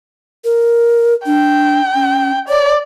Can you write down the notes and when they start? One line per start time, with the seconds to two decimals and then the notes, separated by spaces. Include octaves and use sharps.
0.44 A#4
1.26 D4 G5
1.94 C#4
2.49 C#5 D5